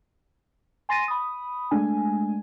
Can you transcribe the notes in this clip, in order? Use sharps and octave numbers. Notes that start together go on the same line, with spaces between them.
G#5 C6 A6 A#6 D#7
B5 D#6
G#3 A3 D4 G#5